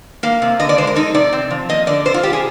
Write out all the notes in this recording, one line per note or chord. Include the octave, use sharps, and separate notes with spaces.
A#3 F5
C3
D3 D#5
D5
G#3 C5
A#4
F2 D#4
C3 D5
C4
F3
A#3 D#5
D3 D5
C3 C5
F4
G3 G4
G#4